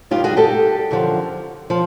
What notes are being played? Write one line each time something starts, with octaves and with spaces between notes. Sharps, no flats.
G2 D#3 F4 G4
F#4 G#4
G4 A4
F#2 D3 F3
F3